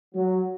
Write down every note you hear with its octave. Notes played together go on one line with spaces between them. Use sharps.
F#3